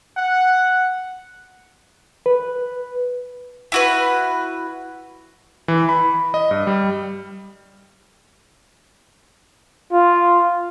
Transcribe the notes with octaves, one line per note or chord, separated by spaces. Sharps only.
F#5
B4
E4 F#4 B4
E3
B5
D#5
G2
G3
F4